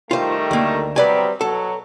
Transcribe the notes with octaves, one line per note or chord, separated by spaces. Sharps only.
D#3 G3 A3 F4 C5
D2 A#3
C3 F#3 G3 B4 D5 G#5
B2 F#3 A4